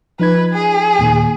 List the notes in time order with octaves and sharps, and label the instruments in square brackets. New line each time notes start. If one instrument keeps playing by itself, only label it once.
[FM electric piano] F3 D#4 G#6 [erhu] B4
[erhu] G#4
[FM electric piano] D#2 A#2 D#3